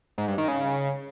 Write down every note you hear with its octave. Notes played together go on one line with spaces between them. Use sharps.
G#2
G2
D#3
C#3